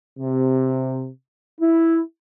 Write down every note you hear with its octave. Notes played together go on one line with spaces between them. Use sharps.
C3
E4